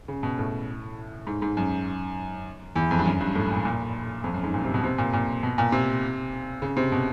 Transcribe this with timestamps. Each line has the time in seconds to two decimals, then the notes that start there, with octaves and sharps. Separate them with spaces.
0.08 C#3
0.23 B2
0.38 A2
1.27 G#2
1.42 G#2
1.57 F#2
2.76 E2
2.91 F2
2.99 G2
3.05 F#2
3.20 G2
3.35 A2
3.50 A#2
3.65 A#2
4.24 F2
4.34 F#2
4.44 G#2
4.54 A#2
4.64 C3
4.74 B2
4.84 C3
4.98 A#2
5.13 A#2
5.43 B2
5.58 A#2
5.72 C3
6.62 C#3
6.77 C3
6.92 B2